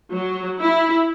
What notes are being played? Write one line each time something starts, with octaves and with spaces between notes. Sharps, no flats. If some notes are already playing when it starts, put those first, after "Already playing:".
F#3
E4